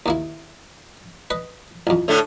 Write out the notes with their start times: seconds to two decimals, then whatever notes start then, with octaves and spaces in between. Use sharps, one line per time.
0.06 D#2 A#3 E4
1.30 B4 D#5
1.87 A1 F2
2.08 A2 D3 A3